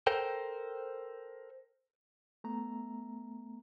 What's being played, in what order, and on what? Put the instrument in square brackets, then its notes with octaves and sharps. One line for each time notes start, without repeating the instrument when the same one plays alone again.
[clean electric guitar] A4 A#4 C5 G5
[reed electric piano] A3 B3 A#5